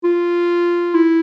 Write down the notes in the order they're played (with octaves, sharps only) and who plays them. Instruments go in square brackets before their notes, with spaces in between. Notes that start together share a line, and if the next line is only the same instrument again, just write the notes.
[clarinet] F4
E4